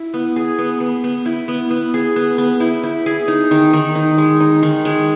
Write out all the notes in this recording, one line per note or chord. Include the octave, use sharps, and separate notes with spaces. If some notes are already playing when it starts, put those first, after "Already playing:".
Already playing: E4
B3
G#4
B3
B3
B3
E4
B3
B3
G#4
B3
B3
E4
E4
G#4
D#4
D#3
D#3
D#4
G#3
D#4
D#3
G#3